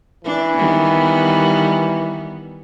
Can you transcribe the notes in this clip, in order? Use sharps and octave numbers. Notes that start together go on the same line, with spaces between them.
E3 D4
D#3 G3 B3